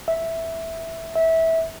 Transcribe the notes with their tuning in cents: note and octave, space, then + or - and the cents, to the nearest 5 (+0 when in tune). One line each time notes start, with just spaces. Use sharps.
E5 -5
E5 -20